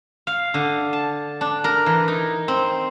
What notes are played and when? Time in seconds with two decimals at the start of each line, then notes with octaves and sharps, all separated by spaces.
0.27 F5
0.54 D3
0.93 A5
1.41 D4
1.64 A#4
1.86 E3
2.08 D#4
2.48 C4